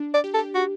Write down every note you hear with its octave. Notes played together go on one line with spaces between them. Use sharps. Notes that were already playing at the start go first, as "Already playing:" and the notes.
Already playing: D4
D5
G4
A4
G4
F#4